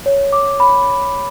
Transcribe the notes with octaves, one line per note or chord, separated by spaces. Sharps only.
C#5
D6
B5